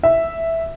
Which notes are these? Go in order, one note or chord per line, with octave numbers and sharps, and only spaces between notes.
E5